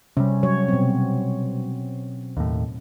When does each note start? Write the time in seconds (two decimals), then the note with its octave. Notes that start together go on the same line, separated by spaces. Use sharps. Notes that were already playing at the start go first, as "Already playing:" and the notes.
0.17 C3 G3 C#4
0.43 F#3 C#5
0.69 B2 C4
2.37 D#2 A2